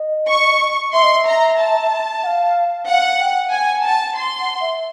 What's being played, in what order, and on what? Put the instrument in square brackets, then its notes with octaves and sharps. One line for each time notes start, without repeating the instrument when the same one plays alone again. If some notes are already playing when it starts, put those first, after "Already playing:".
Already playing: [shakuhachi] D#5
[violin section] C#6
[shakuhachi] E5 [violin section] C6
[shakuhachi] D#5
E5
[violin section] A#5
A5
[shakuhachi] F#5
F5
[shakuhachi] F5 [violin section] F#5
[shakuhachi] G5
[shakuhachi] F#5 [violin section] G#5
[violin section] A5
C6
[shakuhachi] F#5
E5